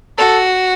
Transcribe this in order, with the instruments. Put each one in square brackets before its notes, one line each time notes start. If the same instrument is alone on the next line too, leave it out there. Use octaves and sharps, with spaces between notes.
[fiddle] F#4 [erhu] A4